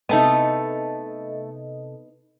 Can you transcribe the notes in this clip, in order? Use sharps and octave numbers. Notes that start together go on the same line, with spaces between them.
C3 A3 B3 D#4 A4 D#5 A5 D#6